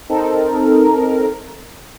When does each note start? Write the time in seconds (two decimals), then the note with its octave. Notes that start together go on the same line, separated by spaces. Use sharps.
0.09 C4 D#4 A4 A#4